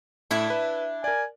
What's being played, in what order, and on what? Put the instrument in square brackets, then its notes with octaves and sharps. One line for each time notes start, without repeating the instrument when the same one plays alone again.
[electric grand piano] A2 [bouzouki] D4 E4 E5
[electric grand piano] B4
[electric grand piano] A#4 D5 [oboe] G#5